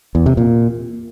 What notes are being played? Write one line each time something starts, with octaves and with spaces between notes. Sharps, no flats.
E2
C3
A#2